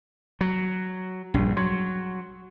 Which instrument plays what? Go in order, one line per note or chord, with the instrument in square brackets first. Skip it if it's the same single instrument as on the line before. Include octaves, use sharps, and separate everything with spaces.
[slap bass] F#3
[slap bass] A#1 [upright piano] G2
[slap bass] F#3 [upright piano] C6 G#6